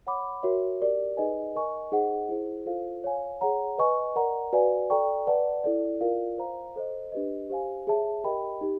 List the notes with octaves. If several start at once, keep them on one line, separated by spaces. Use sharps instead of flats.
C#5 F#5 B5 D6
F#4 A#4 C#5 E5
G4 A#4 D5
D#4 G#4 B4 D#5 G#5
A#4 D#5 G#5 C#6
D#4 G#4 C5 D#5 F#5
E4 G#4 C5
F4 A4 C5 F5
C#5 F5 G#5
G#4 C#5 F#5 A#5
B4 D#5 G#5 C#6
A#4 D5 F#5 A#5
F#4 B4 D5 F5 G#5
A4 D5 G5 A#5 C#6
B4 D5 F#5 A5
E4 A4 D5
F4 A#4 D5 F5
C5 F5 A#5
A4 C5 D#5
D4 G4 B4 D#5
G4 C5 F5 G#5
G#4 C#5 E5 A5
G4 A#4 D#5 G5 B5
D#4 G4